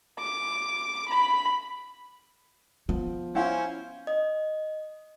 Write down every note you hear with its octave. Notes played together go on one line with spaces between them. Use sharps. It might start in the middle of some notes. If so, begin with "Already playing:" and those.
D6
B5
F3 B3
C#4 E4 C5 F5 F#5
D#5